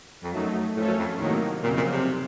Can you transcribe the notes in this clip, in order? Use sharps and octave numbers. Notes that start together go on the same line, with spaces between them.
F2
F#2 F#3 A3 D#4
A2 F3 A3 C#4 A4 C#5
F#2
F2
A2 C3 D#3 F#3 A#3 D#4
F2 A#2 C#3 F#3 C4 D#4
A#2
C3